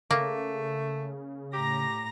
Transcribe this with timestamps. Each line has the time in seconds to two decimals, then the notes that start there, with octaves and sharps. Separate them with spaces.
0.11 C#3 A3 A#3
1.53 A2 G4 A#5 A#6